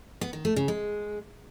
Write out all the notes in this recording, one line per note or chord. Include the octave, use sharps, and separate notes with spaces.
B3
D#3
A3
C#3
G#3